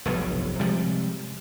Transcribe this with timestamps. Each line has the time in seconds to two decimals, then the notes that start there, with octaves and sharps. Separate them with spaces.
0.05 F1 B1 G2
0.59 C3 F3 G3 G#3